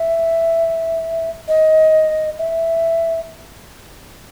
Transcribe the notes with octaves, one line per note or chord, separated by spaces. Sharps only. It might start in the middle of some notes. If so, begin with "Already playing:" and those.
Already playing: E5
D#5
E5